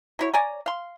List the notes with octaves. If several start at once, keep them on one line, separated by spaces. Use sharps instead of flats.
F#3 E4 C#5
C#5 D5 G#5 A#5
F5 C6